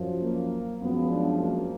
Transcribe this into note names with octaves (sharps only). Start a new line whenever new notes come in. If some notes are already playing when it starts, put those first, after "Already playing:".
Already playing: F#2 F3
A#3
F#2 F3 G#3 B3
D4
A#3